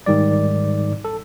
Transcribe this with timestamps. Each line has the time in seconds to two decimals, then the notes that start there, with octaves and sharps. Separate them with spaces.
0.06 G#2 D#3 G3 D5
1.05 A4